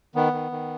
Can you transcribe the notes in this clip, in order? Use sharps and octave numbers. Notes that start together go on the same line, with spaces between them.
D#3 B3
D#3
D#3